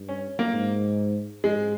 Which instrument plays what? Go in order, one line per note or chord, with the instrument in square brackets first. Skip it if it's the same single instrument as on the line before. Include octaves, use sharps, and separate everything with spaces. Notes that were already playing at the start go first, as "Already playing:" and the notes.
Already playing: [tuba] G2
[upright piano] C#4
A#3
[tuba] G#2
[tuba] G#2 [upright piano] G#3